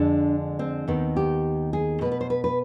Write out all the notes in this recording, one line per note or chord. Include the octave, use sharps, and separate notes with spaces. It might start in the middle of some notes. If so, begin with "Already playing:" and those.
Already playing: F2 D3 G#3 D4
C4
D#2 D#3 B3
G4
G#4
B2 B3 B4
B4
C5
B4
B4